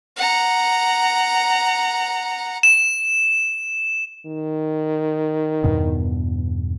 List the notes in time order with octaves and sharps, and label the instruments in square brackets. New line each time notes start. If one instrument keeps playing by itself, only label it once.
[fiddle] F#5 A#5
[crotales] E7
[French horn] D#3
[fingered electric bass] E2 G2 B2